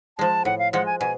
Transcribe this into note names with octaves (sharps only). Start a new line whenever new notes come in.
F3 G#3 A5
A2 F#5
F5
F3 G#3 F#5
G#5
B2 G#5